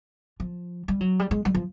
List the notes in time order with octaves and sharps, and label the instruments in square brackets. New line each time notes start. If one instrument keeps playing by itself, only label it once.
[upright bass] F3
G3
F#3
G3
G#3
G3
F3